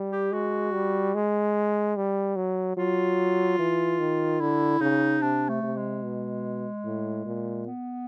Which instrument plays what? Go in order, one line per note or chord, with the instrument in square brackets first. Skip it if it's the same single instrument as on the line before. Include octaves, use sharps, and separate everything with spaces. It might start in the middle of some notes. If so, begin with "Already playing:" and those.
Already playing: [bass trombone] G3
[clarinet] G4
[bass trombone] G#3 [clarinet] F#4
[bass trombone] G3
G#3
G3
F#3
[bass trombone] F#3 [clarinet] F4
[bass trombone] E3
D#3
[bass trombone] D3 [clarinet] E4
[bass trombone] C#3 [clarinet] D#4
[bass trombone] C3 [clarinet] D4
[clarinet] A3
[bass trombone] C3
[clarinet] G#3
[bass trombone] B2
A2
A#2
[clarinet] B3